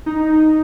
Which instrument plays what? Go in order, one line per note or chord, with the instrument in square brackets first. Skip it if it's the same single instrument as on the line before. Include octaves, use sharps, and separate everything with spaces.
[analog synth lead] D#4